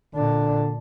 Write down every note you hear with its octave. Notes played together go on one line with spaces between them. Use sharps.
A#2 D3 D4